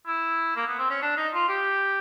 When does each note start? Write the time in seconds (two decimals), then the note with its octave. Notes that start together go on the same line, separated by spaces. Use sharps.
0.06 E4
0.56 A#3
0.67 B3
0.79 C4
0.90 C#4
1.02 D4
1.17 D#4
1.34 F4
1.49 G4